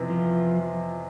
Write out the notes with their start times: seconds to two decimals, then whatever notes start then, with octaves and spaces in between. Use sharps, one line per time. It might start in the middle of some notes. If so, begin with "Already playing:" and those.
Already playing: F2 C3 E3 B3
0.10 F3